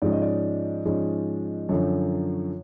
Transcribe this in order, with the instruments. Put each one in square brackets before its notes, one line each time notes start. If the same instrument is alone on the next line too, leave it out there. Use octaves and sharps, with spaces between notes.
[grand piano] G#2 F3 G#3 C#4 D5
D#5
D5
G#2 F3 G#3 C#4
F#2 D3 F3 C#5